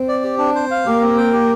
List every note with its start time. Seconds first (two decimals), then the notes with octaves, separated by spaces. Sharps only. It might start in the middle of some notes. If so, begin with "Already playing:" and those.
Already playing: C4
0.08 D5
0.24 G4
0.38 D4
0.55 C5
0.71 F5
0.86 A#3 G4
1.02 C4
1.17 G5
1.33 G4